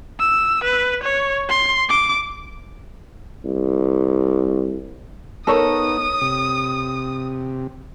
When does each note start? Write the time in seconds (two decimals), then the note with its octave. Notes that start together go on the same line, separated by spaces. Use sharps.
0.20 E6
0.64 B4
1.03 C#5
1.49 C6
1.89 D6
3.45 C2
5.47 B3 D#4 A4 A#4 C#5 D#6
6.21 C3